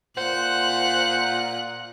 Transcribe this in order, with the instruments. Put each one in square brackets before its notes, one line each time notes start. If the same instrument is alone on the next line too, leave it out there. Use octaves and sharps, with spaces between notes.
[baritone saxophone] A#2 [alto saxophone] C5 [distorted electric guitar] F#5 [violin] F#6